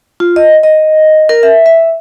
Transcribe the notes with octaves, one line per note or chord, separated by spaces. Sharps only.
F4
D#5
D#5
A#4
E5
E5